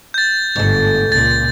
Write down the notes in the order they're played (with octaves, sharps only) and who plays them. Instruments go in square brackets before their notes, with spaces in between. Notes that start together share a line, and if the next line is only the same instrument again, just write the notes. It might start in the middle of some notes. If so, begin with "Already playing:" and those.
[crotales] G6 A6
[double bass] G1 [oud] G#2 A3
[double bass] C#2 A#2 [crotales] A6